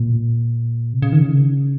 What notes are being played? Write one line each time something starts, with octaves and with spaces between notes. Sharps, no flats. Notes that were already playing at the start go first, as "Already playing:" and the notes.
Already playing: A#2
C3
C#3
D#3
C#3